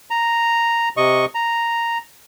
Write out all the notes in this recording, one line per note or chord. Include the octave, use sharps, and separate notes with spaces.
A#5
C3 D#5 C#6
A#5